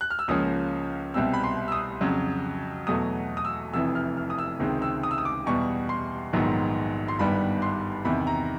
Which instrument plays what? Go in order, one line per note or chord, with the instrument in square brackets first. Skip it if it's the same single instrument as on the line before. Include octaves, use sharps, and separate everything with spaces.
[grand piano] F#6
F6
E6
C#2 C#3 F3 A#3 C#4 D#6
C2 B2 G3 C4 E6
B5
C6
E6
D#6
F2 C#3 F#3
E2 B2 F#3 A3 D#6
D#6
E6
F1 F2 C3 E3 E6
F6
F6
D#6
E6
C#2 C3 D#3 G#3 C4
E6
D#6
E6
D#6
D6
E2 B2 G3 C#6
C6
A#1 G#2 D#3 F#3 B3
C6
G1 G2 D#3 G3 B3 B5
C6
E2 C3 D#3 B5
A#5